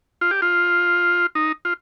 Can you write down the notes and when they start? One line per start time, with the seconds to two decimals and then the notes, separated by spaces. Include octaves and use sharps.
0.21 F4
0.31 G4
0.42 F4
1.35 D#4
1.65 F4